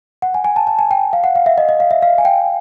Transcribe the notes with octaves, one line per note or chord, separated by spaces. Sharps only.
F#5
G#5
G#5
A5
A5
G#5
G5
F5
F#5
F5
E5
D#5
D#5
F5
E5
F5
G#5
G5